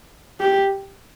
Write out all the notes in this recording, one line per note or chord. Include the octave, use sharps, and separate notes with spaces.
G4